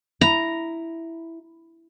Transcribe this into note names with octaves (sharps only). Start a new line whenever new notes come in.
E4 A#5